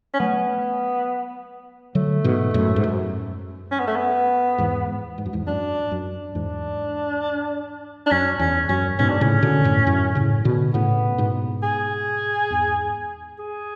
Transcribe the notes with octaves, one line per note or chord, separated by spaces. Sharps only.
C#4
F#3 A3 B3
D3 F#3 A3
G#2 B2
F#2 A2
G#2
F#2
C#4
B3
A3
B3
E2 G#2
G#2
F#2
E2 G#2
F#2 D4
F#2
E2 G#2 D4
D4
F#2 C#4
E2 C#4
F#2 C#4
G#2 B2 C#4
D4
A2 C#3 C#4
B2 D3
F#2 A2
F#2 A2
A2 C#3
B2 D3
A2 C#3 B3
G#2 B2
G#4
E2 G#2
G#4